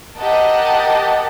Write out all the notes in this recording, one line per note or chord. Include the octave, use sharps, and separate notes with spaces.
G4 A#4 D#5 F#5 A5